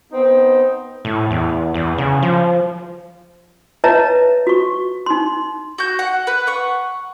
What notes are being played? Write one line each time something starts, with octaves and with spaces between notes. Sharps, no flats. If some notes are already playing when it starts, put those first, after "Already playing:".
B3 C4 D#4
A2
E2
E2
C#3
F3
B4 C#5 D#5 E5 A5 A#5
F#4 C#6
D#4 C6
F#4 G6
F#5
B4
F#5 C#6